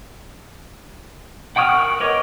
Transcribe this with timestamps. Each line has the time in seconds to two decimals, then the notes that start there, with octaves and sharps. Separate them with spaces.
1.56 F#5 G5 C#6 D#6 F6
1.69 A#4 C#6 F#6
2.00 B4 C#5 D#5 D6